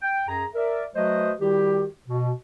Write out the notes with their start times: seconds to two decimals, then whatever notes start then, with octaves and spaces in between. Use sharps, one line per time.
0.02 G5
0.28 F#2 G#4 A#5
0.55 A#4 D5 E5
0.95 F#3 A3 F#4 B4 C5 D#5
1.40 D#3 G3 E4 F#4 G4
2.08 B2